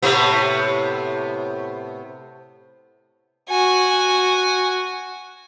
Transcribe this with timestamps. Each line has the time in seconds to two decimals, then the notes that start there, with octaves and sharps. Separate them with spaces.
0.03 A2 C3 B3
3.50 F#4 G#5